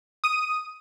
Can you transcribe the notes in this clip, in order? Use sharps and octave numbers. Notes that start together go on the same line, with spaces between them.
D#6 D#7